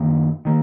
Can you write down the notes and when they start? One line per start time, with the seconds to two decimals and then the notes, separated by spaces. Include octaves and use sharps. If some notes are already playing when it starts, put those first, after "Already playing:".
Already playing: F#2 D#3 A#3
0.45 D#3 A#3